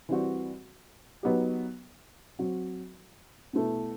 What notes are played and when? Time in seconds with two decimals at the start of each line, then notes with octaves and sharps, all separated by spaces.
0.09 E3 G3 C4 F#4
1.23 F#3 B3 D#4 G4
2.39 F#3 C4 F#4
3.53 B2 A3 E4